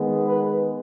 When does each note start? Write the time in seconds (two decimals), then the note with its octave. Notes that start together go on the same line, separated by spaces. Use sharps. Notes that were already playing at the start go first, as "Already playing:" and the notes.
Already playing: D#3 G#3 B3
0.26 B4